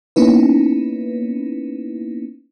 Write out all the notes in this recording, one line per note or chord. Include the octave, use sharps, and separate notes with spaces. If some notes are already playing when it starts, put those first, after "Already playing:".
A#3 B3 C#4 D#4 E4 B4